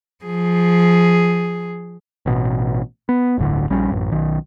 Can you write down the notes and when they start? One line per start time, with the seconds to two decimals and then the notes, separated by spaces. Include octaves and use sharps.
0.24 F3 G#4
2.26 A1 B2
3.09 B3
3.38 D1 G1 A2 D3
3.70 A#1 G3 C#4
3.91 A1 F#2
4.11 B1 D#3